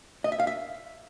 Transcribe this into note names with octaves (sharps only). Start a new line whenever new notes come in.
D#5
E5
F5
E5